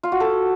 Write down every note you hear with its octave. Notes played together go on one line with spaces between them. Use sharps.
F4
F#4
A4